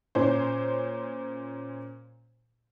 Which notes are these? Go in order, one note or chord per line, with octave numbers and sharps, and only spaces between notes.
A#2 C#4 C5